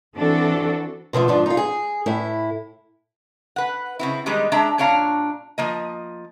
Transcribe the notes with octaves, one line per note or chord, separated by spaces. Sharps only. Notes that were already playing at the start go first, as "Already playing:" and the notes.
E3 C4 D4 F#4 A4
B2 D3 F3 A3
G#2 F3 D4
D#4 F4
G#4
A2 E4
B4 F#5
C#3 C4 E4
D#3 G3 G#3 B3 D#4 G#4
G#3 D4 E5 A5 A#5
A#2 D4 C#5 F5 A#5
F3 A#3 D#5